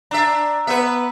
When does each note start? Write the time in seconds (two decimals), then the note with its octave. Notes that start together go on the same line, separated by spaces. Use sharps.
0.11 D4 E5 A#5 E6
0.67 B3 B4 E5